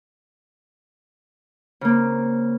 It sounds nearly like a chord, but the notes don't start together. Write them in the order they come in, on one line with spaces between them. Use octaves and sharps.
C#3 A#3 C4